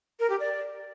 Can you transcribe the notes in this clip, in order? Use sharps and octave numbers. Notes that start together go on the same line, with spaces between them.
A#4
G4
D5